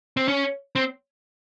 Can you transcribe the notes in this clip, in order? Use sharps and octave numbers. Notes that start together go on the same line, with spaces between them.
C4
C#4
C4